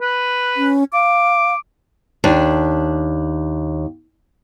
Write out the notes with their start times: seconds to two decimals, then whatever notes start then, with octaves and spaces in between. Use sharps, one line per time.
0.01 B4
0.57 C#4
0.93 F5 D6
2.24 D#2 D4